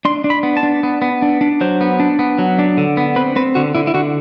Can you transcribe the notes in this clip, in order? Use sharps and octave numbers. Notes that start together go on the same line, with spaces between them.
D4 C6
D4
B5
B3
A5
D4
B3
B3
D4
D4
F#3 C5
B3
D4
B3
F#3
D4
D3
B3
C4 B4
C4 B4
D3 F#4
D3 E4
E4
D3 F#4